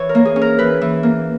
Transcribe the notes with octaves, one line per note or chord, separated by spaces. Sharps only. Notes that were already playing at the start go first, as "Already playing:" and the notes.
Already playing: E3 C#5
A#4
A#3
G#4
C#4
A#4
E3 B4
E3
A#3